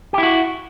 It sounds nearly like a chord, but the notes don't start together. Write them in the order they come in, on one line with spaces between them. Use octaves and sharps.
G4 E4 F#4